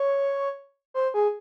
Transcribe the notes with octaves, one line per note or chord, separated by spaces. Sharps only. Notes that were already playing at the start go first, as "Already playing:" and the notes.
Already playing: C#5
C5
G#4